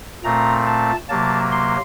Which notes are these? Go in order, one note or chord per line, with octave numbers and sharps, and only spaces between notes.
A#2 A3 C4 A#5
A5
C3 F#3 A#3 A5
C6